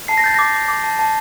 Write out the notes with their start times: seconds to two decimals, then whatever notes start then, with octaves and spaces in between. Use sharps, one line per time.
0.08 A5 C7
0.17 A#6
0.24 G6 A6
0.34 D6 A#6
0.54 D6
0.68 D6
0.84 A5
0.99 A5